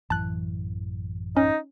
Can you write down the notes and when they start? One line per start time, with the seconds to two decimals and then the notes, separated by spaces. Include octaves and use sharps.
0.10 A1 F#2 E3 A5 F#6
1.37 C#4 D#4